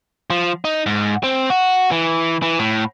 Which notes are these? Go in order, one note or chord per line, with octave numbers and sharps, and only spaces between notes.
F3
D#4
G#2
C4
F#4
E3
E3
A2